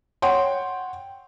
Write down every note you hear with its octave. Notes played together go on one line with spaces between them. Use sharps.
C#5 F#5 G5 C6